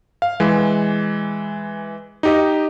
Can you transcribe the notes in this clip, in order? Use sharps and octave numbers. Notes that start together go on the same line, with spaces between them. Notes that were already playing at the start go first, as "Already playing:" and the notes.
F5
E3 G#3
D#4 G4 D#5